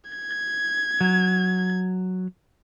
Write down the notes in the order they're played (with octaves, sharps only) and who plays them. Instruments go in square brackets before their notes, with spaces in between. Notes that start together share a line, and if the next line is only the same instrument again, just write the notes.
[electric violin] G#6
[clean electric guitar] F#3